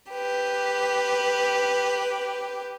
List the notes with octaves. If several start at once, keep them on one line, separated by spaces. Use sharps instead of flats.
G4 B4